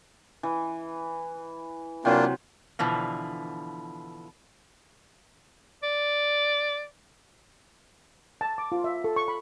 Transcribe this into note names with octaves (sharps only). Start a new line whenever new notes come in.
E3
C3 E3 F#3 A#3 D4 F4
B2 D3 E3 F3
D5
A5
D6
F4
E5
A4
C#6
B5